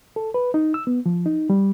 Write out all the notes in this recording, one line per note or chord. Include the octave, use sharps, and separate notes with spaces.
A4
B4
D#4
E6
B3
F3
D#4
G3